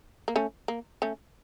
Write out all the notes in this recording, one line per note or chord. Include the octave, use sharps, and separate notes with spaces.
A#3
A3 C#4
A#3
A3 C#4